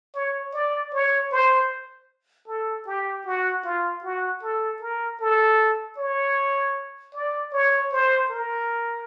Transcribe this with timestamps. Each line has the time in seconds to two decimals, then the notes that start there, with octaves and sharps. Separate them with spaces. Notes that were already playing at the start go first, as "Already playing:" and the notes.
0.15 C#5
0.53 D5
0.93 C#5
1.32 C5
2.48 A4
2.86 G4
3.26 F#4
3.65 F4
4.04 F#4
4.42 A4
4.81 A#4
5.20 A4
5.98 C#5
7.14 D5
7.52 C#5
7.92 C5
8.30 A#4